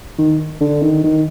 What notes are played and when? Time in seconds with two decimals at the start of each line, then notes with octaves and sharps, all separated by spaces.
0.18 D#3
0.61 D3
0.82 D#3
1.03 D#3